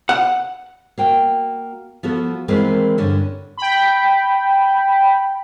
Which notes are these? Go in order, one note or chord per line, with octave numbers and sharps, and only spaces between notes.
F#5
A#3 F#4 G5
F3 B3 F#4 A4
D#3 E3 G#3 A#3 C4 B4
G2 D3 C#4 D4
G5 B5